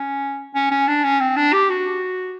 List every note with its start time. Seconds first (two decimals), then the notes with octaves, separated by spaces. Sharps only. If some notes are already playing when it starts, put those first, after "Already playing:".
Already playing: C#4
0.54 C#4
0.71 C#4
0.88 D4
1.04 C#4
1.20 C4
1.37 D4
1.53 G4
1.70 F#4